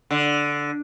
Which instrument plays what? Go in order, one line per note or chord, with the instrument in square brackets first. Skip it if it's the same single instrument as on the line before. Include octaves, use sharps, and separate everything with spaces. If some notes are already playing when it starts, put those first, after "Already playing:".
[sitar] D3